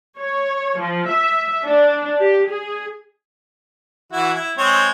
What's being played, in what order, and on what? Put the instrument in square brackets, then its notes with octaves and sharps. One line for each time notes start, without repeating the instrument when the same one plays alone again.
[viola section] C#5
F3
E5
D4
G4
G#4
[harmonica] E3 E4 F#4
E4
G#3 C4 C#5